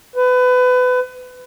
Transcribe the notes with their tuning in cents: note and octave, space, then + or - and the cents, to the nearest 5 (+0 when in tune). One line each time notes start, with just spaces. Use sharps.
B4 +25